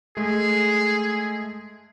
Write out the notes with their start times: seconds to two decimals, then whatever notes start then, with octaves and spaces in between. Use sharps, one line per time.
0.17 G#3 A3 G#4